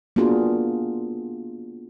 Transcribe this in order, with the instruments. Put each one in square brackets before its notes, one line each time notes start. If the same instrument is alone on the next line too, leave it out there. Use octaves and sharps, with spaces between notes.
[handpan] A#3 B3 D4 F4 F#4 G#4